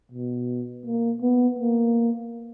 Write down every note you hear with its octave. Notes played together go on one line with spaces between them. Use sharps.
B2
A#3
B3
A#3